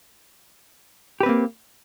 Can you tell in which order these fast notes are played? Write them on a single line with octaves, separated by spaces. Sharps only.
G4 B4 C4 A#3